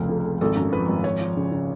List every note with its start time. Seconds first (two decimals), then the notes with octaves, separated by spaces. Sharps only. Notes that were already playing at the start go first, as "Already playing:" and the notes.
Already playing: F1 C#2 F3
0.09 F2
0.25 F3
0.41 G#1 A4
0.56 F#2
0.72 F3 B4
0.89 G#1
1.04 F3 C#5
1.21 F3
1.37 C#3
1.52 C#3